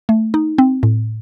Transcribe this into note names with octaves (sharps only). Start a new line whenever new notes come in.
A3
D#4
C4
A2